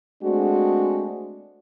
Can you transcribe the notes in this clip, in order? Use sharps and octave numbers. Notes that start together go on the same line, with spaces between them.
G#3 A3 C4 D4 F#4 G#4